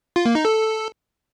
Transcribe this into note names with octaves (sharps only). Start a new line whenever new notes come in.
F4
A#3
D#4
A4